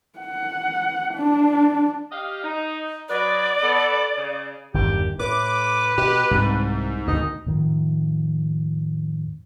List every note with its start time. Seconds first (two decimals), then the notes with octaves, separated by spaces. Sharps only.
0.19 F#5
1.14 D4
2.11 G4 D#5 F5
2.43 D#4
3.09 F#3 B4 D5 D#5
3.62 B3 A4
4.16 C#3
4.74 G1 E2 D#3 G4
5.19 A2 B4 D6
5.98 B2 G4
6.31 C2 G#2
7.07 D2 B2 D#3 D#4
7.46 F2 A2 D#3 F3